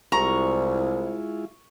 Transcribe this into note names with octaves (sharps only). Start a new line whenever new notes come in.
C2 G#3 E4 F4 A#5 C#6